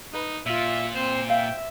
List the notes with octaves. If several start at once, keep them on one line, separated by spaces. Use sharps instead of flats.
D#4 B4 B5
A#2 F4 E5
C4 C5
E5 F5 G5